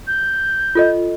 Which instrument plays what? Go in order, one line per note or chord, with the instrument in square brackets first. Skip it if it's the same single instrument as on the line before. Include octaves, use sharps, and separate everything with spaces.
[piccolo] G6
[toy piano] F4 A4 D#5